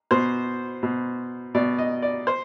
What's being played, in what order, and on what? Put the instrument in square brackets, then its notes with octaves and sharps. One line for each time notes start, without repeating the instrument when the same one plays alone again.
[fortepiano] B2 C5
B2
B2 D5
D#5
D5
C5